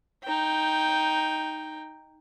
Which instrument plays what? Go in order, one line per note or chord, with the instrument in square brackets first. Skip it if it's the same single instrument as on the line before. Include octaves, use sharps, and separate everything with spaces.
[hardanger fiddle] D#4 G5